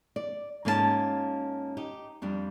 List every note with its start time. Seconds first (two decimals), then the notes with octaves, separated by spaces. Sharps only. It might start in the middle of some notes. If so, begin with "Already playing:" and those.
0.16 D5
0.65 G#2 A#3 C#4 F4 B4 A5
1.77 D#4 G4
2.22 F2 G3 D4